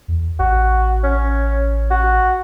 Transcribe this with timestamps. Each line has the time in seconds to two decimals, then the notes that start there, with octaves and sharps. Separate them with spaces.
0.08 E2
0.39 A1 F#4
1.03 C#4
1.90 F#4